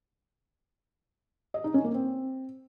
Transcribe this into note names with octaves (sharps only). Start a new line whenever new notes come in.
D#5
D#4
C#4
A#3
C4